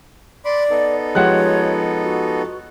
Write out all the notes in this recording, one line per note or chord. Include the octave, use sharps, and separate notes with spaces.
D5 B5 C6 D6
B3 D#4 A4
F3 G#3 G4 C#5 F#5 F#6
F#4